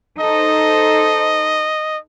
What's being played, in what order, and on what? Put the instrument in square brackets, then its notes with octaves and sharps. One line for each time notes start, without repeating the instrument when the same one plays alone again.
[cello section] D#4 A4 C5 [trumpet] D#5